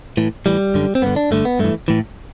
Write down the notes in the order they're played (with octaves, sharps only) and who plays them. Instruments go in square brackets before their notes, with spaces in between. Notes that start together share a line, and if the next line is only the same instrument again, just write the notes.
[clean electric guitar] A2 E3
A2 E3 G3
F#2 D3
C4
G2 D3 B3
D4
G2 D3 A3
B3
G2 E3 A3
A2 E3